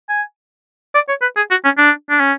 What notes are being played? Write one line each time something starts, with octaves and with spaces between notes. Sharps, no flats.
G#5
D5
C#5
B4
G#4
F#4
C#4
D4
D4
C#4